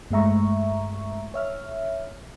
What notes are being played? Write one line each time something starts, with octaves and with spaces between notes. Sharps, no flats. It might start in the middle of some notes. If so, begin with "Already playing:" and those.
G2 G#3 A3 E5 A#5 C#6
C#5 E5 F6